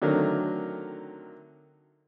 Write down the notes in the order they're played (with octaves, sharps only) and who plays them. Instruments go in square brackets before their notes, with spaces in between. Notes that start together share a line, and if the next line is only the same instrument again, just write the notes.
[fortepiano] D3 D#3 F#3 A3 C4 A#4